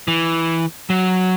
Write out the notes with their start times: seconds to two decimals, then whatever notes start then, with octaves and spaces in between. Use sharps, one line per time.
0.08 E3
0.90 F#3